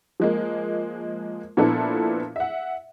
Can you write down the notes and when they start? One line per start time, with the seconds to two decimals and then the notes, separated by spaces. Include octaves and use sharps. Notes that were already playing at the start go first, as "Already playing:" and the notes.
0.20 F3 G#3 A#3
1.57 A#2 F3 B3 D4 E4 A4
2.36 E5 F#5